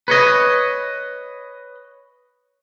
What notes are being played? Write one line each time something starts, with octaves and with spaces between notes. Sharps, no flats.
B4 C#5 D#5